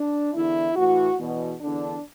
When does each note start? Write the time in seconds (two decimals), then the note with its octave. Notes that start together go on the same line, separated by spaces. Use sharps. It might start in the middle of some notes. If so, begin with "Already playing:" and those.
Already playing: D4
0.33 E2 D3 E4
0.76 A2 E3 F#4
1.18 E2 B2
1.61 E2 D3 D4